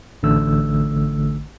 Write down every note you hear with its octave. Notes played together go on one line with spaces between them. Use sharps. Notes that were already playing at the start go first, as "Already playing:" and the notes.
A1 D3 A3 E6